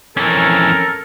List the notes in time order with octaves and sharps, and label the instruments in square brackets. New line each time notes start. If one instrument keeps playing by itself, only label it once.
[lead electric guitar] F2 E3 [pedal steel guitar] C#4 C#5 [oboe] A4 [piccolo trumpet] A#4